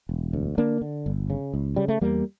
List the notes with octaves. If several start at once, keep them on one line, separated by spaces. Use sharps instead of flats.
E1
D2
D3 A#3 D4
D3
G1
C#3
C#2
C#3 G3
A3
E2 G3 A#3